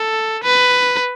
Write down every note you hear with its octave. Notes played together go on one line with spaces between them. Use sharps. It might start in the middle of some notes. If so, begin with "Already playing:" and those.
Already playing: A4
B4